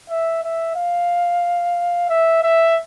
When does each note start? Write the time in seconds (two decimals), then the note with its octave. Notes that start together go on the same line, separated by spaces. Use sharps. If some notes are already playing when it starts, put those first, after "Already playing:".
0.09 E5
0.43 E5
0.76 F5
2.10 E5
2.43 E5